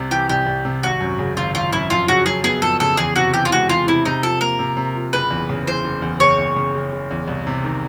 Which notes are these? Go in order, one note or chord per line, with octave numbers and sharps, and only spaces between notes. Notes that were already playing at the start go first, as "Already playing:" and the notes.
Already playing: C2 C3
E3 G4
C2 G4
C2
C3
G#1 F#4
F#2
C#3
G#1 F4
G#1 F4
F#2 E4
F2 F4
C#3 F#4
F#3 G#4
B3 G#4
F2 A4
C#3 A4
E2 G#4
C3 F#4
E3 G4
F4
G#3 F#4
E2 F4
C3 E4
C3 D#4
F3 A4
A#3 A#4
C3
C3
F3
F#1 B4
E2
C#3
E3 C5
F#1
E2
F#1 C#5
E2
C#3
F#1
F#1
E2
C2
C3
D#3